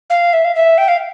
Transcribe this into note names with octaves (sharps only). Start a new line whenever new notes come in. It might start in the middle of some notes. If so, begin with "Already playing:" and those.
F5
E5
F5
E5
G5
F5